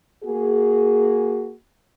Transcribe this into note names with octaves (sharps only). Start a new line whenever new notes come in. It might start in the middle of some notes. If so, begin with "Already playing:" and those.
A#3 F#4 G#4